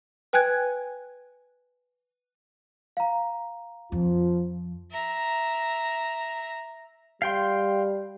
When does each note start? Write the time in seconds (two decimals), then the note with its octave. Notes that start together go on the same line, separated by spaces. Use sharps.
0.33 B4 G5 G#5 F#6 G#6
2.97 F5 A#5
3.92 F2 F3 F4
4.92 E5 A#5
7.22 G3 F5 G5 C6